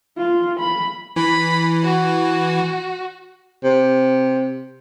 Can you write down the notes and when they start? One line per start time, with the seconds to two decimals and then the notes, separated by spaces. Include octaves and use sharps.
0.18 F4
0.59 B5
1.16 E3 B5
1.84 F#4
3.63 C3